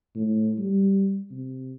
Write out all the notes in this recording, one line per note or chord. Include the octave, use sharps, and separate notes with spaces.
A2
G3
C3